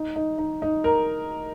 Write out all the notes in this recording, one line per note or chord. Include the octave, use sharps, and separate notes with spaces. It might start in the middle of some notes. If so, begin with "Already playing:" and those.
Already playing: D#4
D#4
D#4
D#4
A#4